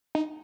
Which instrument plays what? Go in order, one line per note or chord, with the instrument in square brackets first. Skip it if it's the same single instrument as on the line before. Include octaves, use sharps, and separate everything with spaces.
[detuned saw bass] D#4